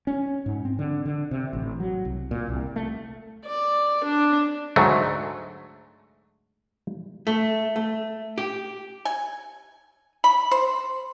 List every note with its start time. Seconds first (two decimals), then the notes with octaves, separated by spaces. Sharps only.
0.07 C#4
0.46 G#2
0.65 C4
0.79 D3
1.05 D3
1.31 C3
1.53 A1
1.80 F#3
2.05 C2
2.31 A#2
2.49 C2
2.76 A3
3.45 D5
4.04 D4
4.76 D2 G#2 F#3 A3
7.27 A3
7.76 A3
8.38 G4
9.05 G#5
10.24 B5
10.51 C5